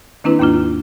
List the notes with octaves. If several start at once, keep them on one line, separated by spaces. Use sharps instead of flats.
D#3 A#3 C4 D4 E4 B4
D#2 G#2 A#3 D4 F4